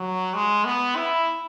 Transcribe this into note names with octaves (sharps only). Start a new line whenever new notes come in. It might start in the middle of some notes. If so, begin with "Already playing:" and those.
Already playing: F#3
G#3
B3
E4